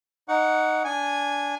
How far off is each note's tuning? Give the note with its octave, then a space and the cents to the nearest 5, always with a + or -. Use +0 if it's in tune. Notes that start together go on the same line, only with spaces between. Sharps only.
D#4 +0 F#5 +0 C#6 +40
D4 -25 G#5 -10